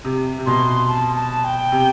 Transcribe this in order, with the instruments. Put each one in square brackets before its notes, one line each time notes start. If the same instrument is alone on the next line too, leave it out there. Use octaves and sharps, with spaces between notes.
[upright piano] C3
C3
[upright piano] B2 [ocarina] C6
[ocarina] A5
A5
G5
[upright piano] C3